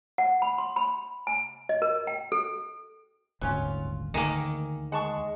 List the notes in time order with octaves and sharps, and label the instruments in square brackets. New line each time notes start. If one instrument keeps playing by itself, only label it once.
[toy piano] F#5
B5
C6
B5
G#5
D#5
A#4
G5
A4
[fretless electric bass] D#1 G#1 D2 [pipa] F#3 C#4 F4
[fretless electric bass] D2 [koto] D#3 A#3 [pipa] G#4
[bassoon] G#3 [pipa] F#5 A5 C#6